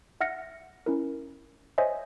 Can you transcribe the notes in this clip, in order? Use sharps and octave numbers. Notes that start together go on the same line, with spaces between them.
E5 F#5 F6 A#6 C#7
C#4 E4 A#4
C5 C#5 D#5 E5 G#5